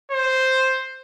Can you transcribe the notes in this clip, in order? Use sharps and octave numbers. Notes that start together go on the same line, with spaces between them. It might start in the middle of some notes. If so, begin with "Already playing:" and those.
C5